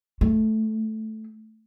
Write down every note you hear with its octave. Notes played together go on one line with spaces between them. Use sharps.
A3